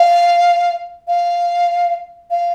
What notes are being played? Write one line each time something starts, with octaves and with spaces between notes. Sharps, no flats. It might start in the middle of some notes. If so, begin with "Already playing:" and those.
Already playing: F5
F5
F5